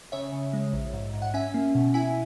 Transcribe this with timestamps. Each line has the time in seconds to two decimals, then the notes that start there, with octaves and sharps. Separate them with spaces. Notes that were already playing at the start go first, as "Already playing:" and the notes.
0.12 C#3 C#5 E5
0.32 C#3
0.53 G#3
0.73 A#1
0.93 G#2
1.13 G#2
1.22 F#5
1.34 C#4 E5 G#5
1.54 A#3
1.75 B2
1.94 E4 E5 G#5